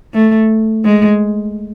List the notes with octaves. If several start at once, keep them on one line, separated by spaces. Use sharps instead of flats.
A3
G#3